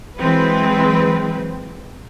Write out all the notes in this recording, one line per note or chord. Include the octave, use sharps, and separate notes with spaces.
E3 F#3 G#3 C4 B4